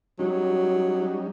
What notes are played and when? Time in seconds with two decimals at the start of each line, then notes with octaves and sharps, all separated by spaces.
0.19 F#3 G3 C#4 D#4